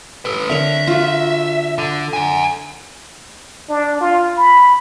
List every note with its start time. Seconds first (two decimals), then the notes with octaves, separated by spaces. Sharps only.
0.25 A4 B4
0.50 D3 A#4 C#5 E5
0.87 F4 F#4
1.78 D3
2.13 F#5 G#5
3.69 D4
4.01 F4
4.37 B5